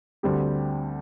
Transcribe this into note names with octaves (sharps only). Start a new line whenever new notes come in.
D2 D3 G3 C4 G4